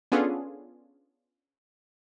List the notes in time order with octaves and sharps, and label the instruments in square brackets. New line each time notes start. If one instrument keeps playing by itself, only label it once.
[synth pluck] B3 C#4 D4 F4 G#4 A4